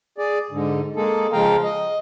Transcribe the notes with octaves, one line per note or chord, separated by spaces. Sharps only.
G#4 D5
G#2 D3
G#3 A#3 G#4 A4
C#3 F3 G#3 F5 G5 A#5
D#5